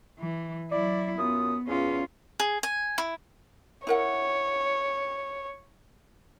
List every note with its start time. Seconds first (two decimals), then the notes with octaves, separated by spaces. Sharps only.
0.20 E3
0.71 F#3 E4 D5
1.18 F#2 B3 F4 D#6
1.67 E2 C#4 F4
2.40 G#4
2.63 G#5
2.98 E4
3.87 E4 A#4 C#5 F#5